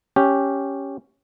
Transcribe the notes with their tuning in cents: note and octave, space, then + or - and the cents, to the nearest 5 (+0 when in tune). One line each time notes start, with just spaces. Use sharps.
C#4 +0 G4 +0